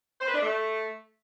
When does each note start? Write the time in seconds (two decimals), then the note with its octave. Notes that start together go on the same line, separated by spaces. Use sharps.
0.20 C5
0.27 B4
0.34 D4
0.41 A3